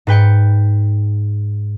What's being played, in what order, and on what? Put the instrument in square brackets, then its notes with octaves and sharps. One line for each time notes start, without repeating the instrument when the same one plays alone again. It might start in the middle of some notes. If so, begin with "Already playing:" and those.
[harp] G#2 B4 G5 C#7